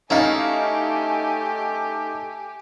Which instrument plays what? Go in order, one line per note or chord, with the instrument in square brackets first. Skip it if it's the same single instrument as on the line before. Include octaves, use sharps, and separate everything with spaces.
[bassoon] A3 [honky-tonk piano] C#4 D#4 F5 [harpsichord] E4 A4 [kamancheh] G4 G#5